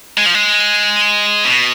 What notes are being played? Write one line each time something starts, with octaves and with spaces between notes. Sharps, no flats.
G#3
F3
G#3
B2